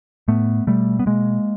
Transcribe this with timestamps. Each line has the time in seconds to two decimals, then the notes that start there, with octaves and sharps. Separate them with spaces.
0.28 A2 A3 B3
0.67 B2 G3 A3
0.99 B3
1.06 B2 G#3 A#3